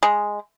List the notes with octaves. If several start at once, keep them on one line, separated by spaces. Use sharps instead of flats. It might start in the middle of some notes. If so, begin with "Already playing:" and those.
G#3